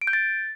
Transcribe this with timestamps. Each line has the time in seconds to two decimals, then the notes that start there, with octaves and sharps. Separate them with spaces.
0.02 D7
0.07 G6
0.13 A6